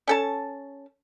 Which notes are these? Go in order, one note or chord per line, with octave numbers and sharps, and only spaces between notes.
C#4 A4 A5